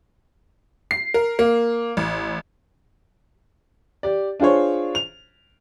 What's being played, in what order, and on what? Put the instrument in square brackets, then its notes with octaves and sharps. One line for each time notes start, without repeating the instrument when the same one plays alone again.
[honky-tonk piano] C7
A#4
A#3
A1
[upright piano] G4 D5
D4 F4 G#4 C5 C#5
F7